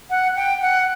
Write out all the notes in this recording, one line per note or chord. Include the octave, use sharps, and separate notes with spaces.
F#5
G5
F#5